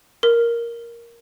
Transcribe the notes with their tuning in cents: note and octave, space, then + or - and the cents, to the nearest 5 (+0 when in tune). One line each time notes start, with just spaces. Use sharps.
A#4 +5